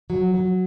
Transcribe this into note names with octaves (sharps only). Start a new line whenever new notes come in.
F#3
F#3